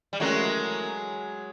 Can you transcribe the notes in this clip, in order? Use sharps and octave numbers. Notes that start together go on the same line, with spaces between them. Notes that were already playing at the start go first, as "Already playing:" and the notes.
G3
E3 F#3 G#3 A3 C#4 F#4 A#4